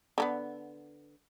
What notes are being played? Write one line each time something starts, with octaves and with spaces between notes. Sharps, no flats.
D3 A3 B3